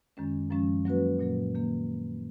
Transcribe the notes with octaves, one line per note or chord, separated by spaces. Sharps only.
F#2 D#3 G#3 C#4
F#2 F3 G#3 C#4
F#3 A#3 C#4 F#4 B4
A#2 F#3 A#3
D#3 A#3